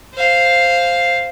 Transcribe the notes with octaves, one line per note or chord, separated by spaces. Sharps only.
C5 F5